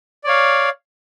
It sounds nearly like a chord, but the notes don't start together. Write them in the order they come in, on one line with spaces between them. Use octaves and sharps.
D5 C#5 F5